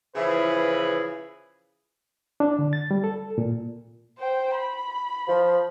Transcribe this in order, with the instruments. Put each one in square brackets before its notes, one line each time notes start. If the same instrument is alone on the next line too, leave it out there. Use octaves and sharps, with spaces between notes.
[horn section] C#3 E3 F3 E4 G#4 B4
[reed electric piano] D4
D3
A6
G3
A4
A#2
[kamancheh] C5 G5
B5
[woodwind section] F3